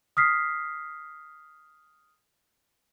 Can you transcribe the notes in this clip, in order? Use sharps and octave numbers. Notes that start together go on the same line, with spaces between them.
D#6 F6 B6 C7